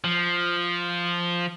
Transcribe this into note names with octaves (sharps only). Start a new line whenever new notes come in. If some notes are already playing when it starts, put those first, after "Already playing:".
F3